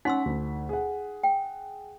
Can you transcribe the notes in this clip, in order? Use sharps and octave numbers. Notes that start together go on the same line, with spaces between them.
C#4 D#4 F#5 C6 E6 B6
D2
G#4 F#5
G5